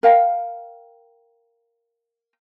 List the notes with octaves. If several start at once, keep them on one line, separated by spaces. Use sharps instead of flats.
A#4 F5 G5